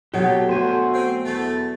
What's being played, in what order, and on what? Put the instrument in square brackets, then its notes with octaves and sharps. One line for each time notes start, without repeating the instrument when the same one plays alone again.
[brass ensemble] A#1 [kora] B2 F#3 [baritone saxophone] A3 [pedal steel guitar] G4
[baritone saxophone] D2 [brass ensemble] A3 F#4 [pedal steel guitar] C5 G#5
[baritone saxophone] C4
[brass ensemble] E2 B3 [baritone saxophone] A3